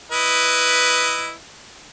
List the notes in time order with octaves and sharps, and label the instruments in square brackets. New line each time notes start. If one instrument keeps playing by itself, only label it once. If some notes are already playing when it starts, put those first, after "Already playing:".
[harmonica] E4 B4 D#5